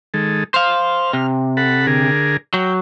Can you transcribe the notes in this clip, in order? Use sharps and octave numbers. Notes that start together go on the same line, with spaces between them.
D#3 G#3 A4
C5 F5 F6
C3
A4 F#5 B5
D3 G#4 A#4
F#3 G5